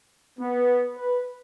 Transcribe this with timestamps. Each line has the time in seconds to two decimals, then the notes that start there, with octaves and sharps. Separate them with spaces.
0.38 B3
0.96 B4